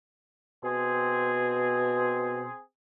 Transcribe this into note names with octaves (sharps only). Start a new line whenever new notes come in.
B2 C4 G#4